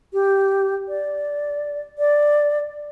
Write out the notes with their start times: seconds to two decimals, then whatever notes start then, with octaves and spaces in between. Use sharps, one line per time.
0.13 G4
0.89 D5
1.98 D5